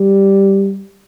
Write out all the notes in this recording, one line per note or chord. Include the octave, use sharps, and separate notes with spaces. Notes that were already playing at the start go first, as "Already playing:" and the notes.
Already playing: G3